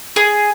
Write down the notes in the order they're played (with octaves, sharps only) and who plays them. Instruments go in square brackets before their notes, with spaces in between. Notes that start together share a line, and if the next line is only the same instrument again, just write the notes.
[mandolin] G#4